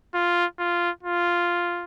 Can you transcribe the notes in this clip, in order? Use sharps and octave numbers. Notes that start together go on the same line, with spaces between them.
F4
F4
F4